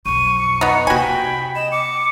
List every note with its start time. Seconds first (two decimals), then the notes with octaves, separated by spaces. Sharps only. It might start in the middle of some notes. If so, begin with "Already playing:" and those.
0.06 B1 F2 C#6 D#7
0.40 C#7
0.61 B3 D#4 F#5
0.87 C3 A#3 F#4 G5 G#5 B5
1.55 D#5 E7
1.72 D6 C#7